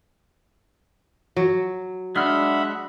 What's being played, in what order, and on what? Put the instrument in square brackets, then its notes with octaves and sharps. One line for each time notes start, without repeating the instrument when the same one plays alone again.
[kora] F#3
[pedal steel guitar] G#3 F6 [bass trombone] D4 [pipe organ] E5 F#5 B5